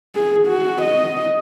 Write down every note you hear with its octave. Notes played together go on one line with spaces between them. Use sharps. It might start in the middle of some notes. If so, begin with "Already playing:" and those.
G#4
F#4
D#5